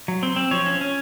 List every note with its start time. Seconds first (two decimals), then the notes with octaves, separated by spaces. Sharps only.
0.08 F#3
0.23 C4
0.36 C4
0.51 F3 C#5
0.66 C#4
0.81 C#4